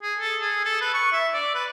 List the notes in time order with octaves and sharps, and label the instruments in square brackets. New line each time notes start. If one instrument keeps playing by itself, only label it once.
[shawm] G#4
A4
G#4
A4
B4
C#6
E5
D5
B4